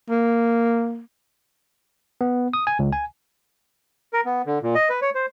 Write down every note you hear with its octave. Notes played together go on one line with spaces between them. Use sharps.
A#3
B3
D#6
G#5
C#2
G#5
A#4
B3
D3
A#2
D#5
B4
C#5
C5